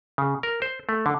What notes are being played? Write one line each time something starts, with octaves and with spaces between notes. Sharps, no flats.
C#3
A#4
C5
A3
D3